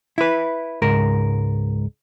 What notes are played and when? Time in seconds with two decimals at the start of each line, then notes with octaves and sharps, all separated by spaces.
0.18 E4 B4
0.82 C#2 G#2 A#4